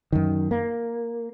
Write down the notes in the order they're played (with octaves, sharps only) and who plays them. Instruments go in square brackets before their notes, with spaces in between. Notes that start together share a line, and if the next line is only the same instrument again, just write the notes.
[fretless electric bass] F#2 D#3
A#3